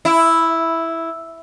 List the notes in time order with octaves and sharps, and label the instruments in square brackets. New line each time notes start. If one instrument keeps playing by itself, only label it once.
[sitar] E4